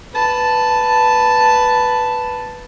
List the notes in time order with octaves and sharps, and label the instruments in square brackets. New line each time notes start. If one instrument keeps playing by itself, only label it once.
[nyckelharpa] B4 A5